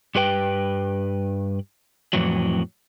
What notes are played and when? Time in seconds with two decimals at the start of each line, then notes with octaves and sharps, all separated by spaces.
0.15 G2 G4 B4 G5
2.13 F2 A2 E3 F#3